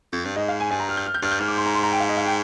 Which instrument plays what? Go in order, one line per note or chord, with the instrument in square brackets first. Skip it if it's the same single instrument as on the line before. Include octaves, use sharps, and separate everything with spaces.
[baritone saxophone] F2
G2
[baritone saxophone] G#2 [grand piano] D#5
[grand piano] F5
G#5
[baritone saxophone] G2 [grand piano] G#5
[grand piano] A#5
F6
G6
F6
G6
[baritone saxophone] G2 [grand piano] F6
[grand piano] G6
[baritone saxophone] G#2 [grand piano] F6
[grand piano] D6
C6
A#5
C6
A#5
G5
F5
D#5
F5
G5